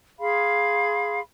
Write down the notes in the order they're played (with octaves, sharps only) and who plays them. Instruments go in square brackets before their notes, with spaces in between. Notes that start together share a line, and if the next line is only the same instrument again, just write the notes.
[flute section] G#4 F5 B5 C6